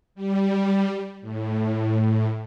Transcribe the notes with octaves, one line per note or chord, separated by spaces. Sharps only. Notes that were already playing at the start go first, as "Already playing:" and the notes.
G3
A2